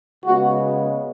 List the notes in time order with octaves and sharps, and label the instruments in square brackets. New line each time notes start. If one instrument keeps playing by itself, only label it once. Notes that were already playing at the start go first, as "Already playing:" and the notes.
[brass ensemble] C#3 G#3 B3 F#4